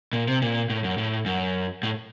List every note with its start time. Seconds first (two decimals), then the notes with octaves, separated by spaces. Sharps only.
0.13 A#2
0.28 C3
0.42 A#2
0.70 A2
0.84 F#2
0.98 A2
1.26 F#2
1.83 A2